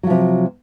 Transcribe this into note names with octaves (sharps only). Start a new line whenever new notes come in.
C3 F3 F#3